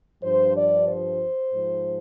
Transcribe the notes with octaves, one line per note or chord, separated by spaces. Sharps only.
G2 F3 C5
D5
C5
G#2 F3